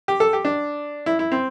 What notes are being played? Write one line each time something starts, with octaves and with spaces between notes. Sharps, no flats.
G4
A4
G4
D4
E4
E4
C4